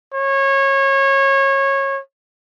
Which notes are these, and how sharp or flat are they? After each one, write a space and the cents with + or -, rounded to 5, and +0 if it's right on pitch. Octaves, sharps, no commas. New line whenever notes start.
C#5 -25